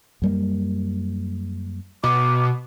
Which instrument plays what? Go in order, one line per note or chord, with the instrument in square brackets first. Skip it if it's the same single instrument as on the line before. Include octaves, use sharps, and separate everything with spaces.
[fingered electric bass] F#2 G3 A#3
[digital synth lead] B2 [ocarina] D6